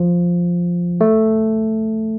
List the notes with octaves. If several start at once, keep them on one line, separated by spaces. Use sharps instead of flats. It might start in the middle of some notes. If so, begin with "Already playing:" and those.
Already playing: F3
A3